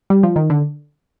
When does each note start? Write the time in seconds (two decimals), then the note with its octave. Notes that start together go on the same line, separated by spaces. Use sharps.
0.10 G3
0.23 F3
0.36 D#3
0.50 D3